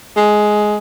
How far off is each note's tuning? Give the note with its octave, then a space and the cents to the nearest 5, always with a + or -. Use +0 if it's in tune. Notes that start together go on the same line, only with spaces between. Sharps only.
G#3 +10